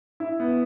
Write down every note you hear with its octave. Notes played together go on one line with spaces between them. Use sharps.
E4
B3